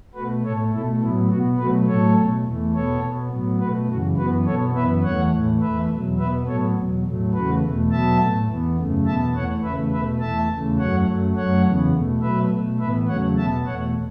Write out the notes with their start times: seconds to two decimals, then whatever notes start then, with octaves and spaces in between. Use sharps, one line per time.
0.14 B2 A3 F#4 B4
0.43 A2 A3 A4 C#5
0.72 B2 A3 E4 A4
1.00 A2 F#3 B3 E4
1.29 B2 B3 F#4
1.58 B2 F#3 A3 F#4 B4
1.87 A2 F#3 A3 A4 C#5
2.16 B2 A3
2.45 E2 E3 A3
2.74 B2 B3 A4 C#5
3.02 B2 B3
3.31 A2 F#3 B3
3.59 B2 A3 F#4 B4
3.89 F#2 C#3 E3 F#4
4.17 F#2 E3 B3 F#4 B4
4.46 B2 B3 A4 C#5
4.75 F#2 E3 B3 B4 E5
5.03 E2 E3 A3 C#5 F#5
5.32 A2 E3 A3
5.60 E2 E3 A3 B4 E5
5.90 E2 B2 F#3
6.19 B2 B3 B4 E5
6.47 A2 F#3 B3 A4 C#5
6.76 E2 B2 F#3
7.05 A2 F#3 A3
7.33 E2 C#3 E3 A3 F#4 B4
7.62 E2 B2 A3
7.91 B2 F#3 B3 E5 A5
8.19 A2 A3
8.49 E2 E3 B3
8.77 F#2 C#3 A3
9.05 E2 B2 B3 E5 A5
9.34 E2 E3 A3 C#5 F#5
9.63 E2 C#3 A3 B4 E5
9.92 B2 A3 B4 E5
10.20 E2 E3 A3 E5 A5
10.50 E2 C#3 E3 A3
10.78 F#2 F#3 A3 C#5 F#5
11.08 F#2 F#3 A3
11.36 F#2 F#3 A3 C#5 F#5
11.64 E2 C#3 E3 B3
11.93 B2 A3
12.21 B2 F#3 A3 B4 E5
12.51 B2 A3
12.79 A2 E3 B3 B4 E5
13.08 E2 C#3 F#3 A3 C#5 F#5
13.37 B2 B3 E5 A5
13.65 E2 B2 A3 C#5 F#5